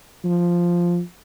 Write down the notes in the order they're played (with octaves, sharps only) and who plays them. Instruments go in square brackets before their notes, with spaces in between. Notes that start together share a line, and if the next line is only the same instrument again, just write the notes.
[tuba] F3